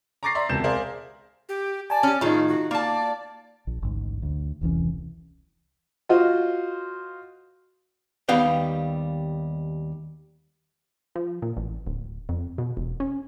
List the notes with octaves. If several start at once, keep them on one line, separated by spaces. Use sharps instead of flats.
A#5 C#6 D6 A6 A#6 C7
D5 E5 A#5 C6
E1 C#2 C3 A5 G6 E7
G#4 A#4 C5 D5 E5 F5
G4
D5 G#5 A5
C#4 G4
A2 D#3 D#4 F4 G#4
F#4
A#3 D5 A5
A#1
A1 D2 G#2
D2
E1 C2 E3 C#4
F4 F#4 C5 D#5
D#2 G3 B3 F5 G5
F3
A#2
A1
D1
F2
B2
E1
C#4